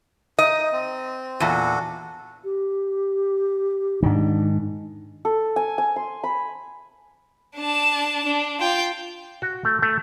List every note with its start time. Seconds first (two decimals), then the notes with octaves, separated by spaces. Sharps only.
0.38 D#4 D#5
0.73 C4
1.40 E2 A#2 D4 F#4 A4
2.44 G4
4.03 G#2 D#3 D4
5.25 A4
5.56 G#5
5.78 G#5
5.96 C6
6.24 B5
7.56 D4 A5
8.25 D4
8.61 F4 G5
9.42 F#4
9.65 A3
9.82 A3